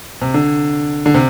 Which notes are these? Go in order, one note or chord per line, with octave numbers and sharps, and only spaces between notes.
C3
D3
D3
C3